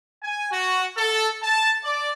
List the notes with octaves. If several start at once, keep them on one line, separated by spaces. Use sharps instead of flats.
G#5
F#4
A4
A5
D5